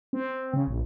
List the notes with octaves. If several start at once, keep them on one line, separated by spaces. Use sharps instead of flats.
C4
C#3
A#1